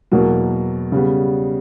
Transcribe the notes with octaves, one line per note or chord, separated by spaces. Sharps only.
E2 B2 F#3 A#3
C#3 G3 B3